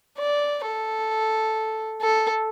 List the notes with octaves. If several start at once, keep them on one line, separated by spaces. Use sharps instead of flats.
D5
A4
A4